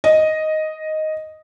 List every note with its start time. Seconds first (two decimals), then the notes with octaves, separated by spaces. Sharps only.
0.04 D#5